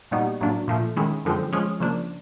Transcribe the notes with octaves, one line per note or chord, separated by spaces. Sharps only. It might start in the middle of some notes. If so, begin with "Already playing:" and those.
A#2 G3 B3 D#4 F#4
A2 F#3 A#3 D4
A#2 F3 A3
D#3 G#3 C#4 E4
F#2 D3 F3 G#3 C4
F3 G#3 C#4 F4 G#4
C#3 F3 A#3 D4